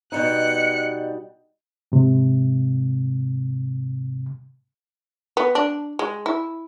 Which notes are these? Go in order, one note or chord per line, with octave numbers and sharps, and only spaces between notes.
B2 G3 D#4 F#6 C#7
G#2 C3
B3
D4
G#3
E4